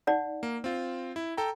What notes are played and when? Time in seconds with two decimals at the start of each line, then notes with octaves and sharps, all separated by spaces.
0.07 D#4 D5 F#5
0.43 A#3
0.64 C4 F4
1.16 E4
1.37 A4 G5 A#5